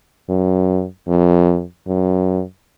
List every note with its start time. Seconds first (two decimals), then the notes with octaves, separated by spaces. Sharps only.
0.29 F#2
1.08 F2
1.87 F#2